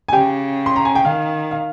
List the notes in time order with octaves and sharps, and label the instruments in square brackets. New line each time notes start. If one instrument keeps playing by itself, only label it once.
[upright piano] G#5
[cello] C#3 [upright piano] G4 G5
[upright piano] C6
A#5
G#5
G5
[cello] D#3 [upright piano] F5
[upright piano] F5